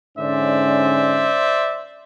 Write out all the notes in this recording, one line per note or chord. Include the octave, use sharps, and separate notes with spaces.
G#2 D3 C#4 C5 D5 E5